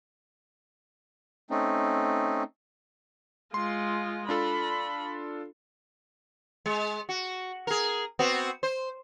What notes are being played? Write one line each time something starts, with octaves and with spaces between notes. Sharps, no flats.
A3 C4 C#4 D#4
G#3 F4 C6
D4 F4 A4 B5
G#3
F#4
G#4 A#4
B3 C4 F#4
C5